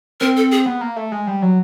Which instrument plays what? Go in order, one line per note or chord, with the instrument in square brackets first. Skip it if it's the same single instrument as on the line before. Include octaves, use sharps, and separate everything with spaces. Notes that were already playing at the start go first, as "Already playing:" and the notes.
[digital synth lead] C4 [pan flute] A#4
[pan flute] A4
G#4
[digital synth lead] B3
A#3
A3
G#3
G3
F#3